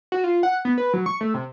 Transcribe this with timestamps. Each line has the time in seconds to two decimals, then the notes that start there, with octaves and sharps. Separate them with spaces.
0.12 F#4
0.24 F4
0.43 F#5
0.65 B3
0.78 B4
0.93 F#3
1.06 C#6
1.21 A3
1.34 C3